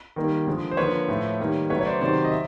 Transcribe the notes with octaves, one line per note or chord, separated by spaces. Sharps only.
D#3 G3 A#3
D3 F3 G#3
C5
D3 F3 A#3 B4 C#5
A2 F3 A3
D#3 G3 A#3
C#3 F#3 A3 B4 C#5
C#5
C5 D5
C3 D#3 F#3 C5 D5
D#5
E5